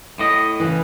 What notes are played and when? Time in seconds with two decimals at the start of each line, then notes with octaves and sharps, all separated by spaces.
0.19 A2 D#5
0.60 C#3 E3